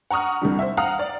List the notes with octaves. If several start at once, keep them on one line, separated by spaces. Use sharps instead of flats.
F#5 A#5 C#6 D#6 F6
C2 D3 E3 G3
C5 E5
F5 F#5 A#5 D#6 F6
D5